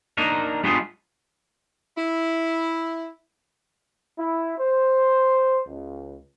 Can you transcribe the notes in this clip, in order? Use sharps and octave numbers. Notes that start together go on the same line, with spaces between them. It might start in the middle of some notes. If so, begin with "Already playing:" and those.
A#3 D4 D#4 A#4
G3 B3 D4 D#4 F4 G#4
E4
E4
C5
C#2